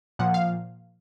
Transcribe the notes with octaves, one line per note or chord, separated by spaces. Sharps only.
A#2 F3 F#5
F5